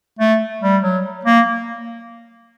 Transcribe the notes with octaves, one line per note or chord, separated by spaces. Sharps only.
A3
G3
F#3
A#3